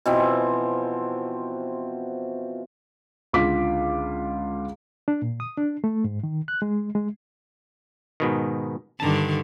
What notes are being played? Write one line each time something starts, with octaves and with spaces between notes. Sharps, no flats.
B2 E3 F3 C4
C#2 D3 F4 D6 B6
D4
A#2
D#6
D4
A3
G#2
D#3
F#6
G#3
G#3
G#2 B2 D#3
G2 D3 D#3 A5 A#5